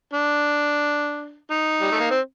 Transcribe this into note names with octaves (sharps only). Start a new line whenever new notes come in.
D4
D#4
G3
A3
A#3
C4